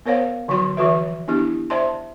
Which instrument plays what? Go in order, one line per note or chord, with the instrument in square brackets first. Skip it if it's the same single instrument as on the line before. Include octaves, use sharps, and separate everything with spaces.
[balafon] B3 A#4 C5 C#5 F5 F#5
D3 F3 F#3 F#4 C6
E3 F3 F#4 B4 E5
B3 D4 E4 G4
C5 D5 E5 A5 C6